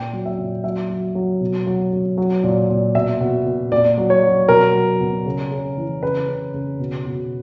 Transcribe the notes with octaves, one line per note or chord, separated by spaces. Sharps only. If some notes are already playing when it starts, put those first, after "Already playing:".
Already playing: A#2 G5
F#3
E5
A#2
F#3 E5
F#3
F#3
B2
F#3
F#3
F#3
A#2
A#2
B2 E5
B2
B2
A#2 D5
F#3
C#5
F#3
B2 A#4
F#3
B2
C#3
C#3
E3
C#3 B4
C#3
C#3
B2
B2